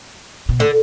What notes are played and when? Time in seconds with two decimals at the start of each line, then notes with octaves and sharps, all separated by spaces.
0.49 B2
0.59 A2 D3